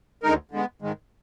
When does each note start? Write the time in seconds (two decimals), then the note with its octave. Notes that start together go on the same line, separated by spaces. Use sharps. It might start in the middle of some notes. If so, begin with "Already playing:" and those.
0.23 D2 D3 G#3 D#4 A#4
0.51 D3 G#3 B3
0.82 G#2 D#3 G#3